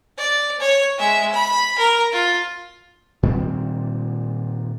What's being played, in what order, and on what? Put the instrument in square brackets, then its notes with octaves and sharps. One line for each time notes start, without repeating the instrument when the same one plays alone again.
[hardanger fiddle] D5
C#5
G#3 E5
B5
A#4
F4
[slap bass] A#2 D#3 G3 C4